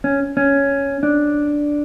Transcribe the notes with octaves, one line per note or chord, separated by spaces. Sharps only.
C#4
C#4
D4